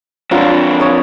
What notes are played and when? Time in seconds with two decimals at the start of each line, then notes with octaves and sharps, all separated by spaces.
0.31 F2 F#3 D4 F4 F#4
0.80 C#5 D#6